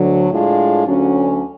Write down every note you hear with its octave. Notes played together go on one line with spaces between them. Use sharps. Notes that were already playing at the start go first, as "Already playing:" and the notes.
Already playing: D2 D3 F#3
A2 G#3 D4 F4
D2 D3 F#3 C#4